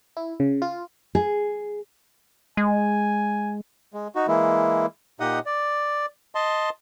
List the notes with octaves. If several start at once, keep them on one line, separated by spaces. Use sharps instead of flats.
E4
C#3
F4
G#4
G#3 G#5
G#3
D#4 F#4
E3 G#3 A#3 E4
A#2 D#4 G4 D#5 F#5 D#6
D5
D#5 A5 C6